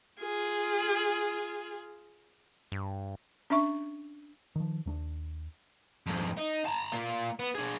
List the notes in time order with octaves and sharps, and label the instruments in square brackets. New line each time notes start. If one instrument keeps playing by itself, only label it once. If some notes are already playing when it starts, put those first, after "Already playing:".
[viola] F4 G#4
[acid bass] G2
[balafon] C#4 D4 E5 C#6
[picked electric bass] D#3 F3
D#2 A3 D4
[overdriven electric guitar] F2 G#2
D#4
A5 A#5
A#3 F4
B3
D4 G#4